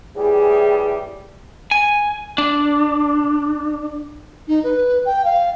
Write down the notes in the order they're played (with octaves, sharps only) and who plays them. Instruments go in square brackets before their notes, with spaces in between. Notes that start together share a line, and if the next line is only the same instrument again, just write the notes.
[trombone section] A2 E3 G3 [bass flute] G#4
[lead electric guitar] G#5
D4
[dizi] D#4
B4
G5
F5